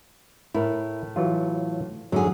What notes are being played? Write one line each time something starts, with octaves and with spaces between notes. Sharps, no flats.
A2 E4 A#4
E3 F#3 F4
F#2 D3 F#3 G#4